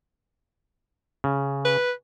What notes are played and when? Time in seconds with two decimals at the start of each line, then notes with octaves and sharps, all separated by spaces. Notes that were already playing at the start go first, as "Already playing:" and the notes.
1.24 C#3
1.65 B4